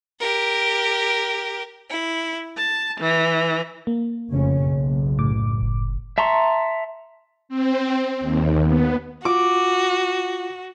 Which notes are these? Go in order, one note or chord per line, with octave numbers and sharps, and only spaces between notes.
G4 A#4
E4
A5
E3
A#3
F1 F2 C#3 C#4
F#1 B1
A2 D6
F#1
E5 A5 A#5 C6 C#6
C4
D#2
B3
F4 F#4 D6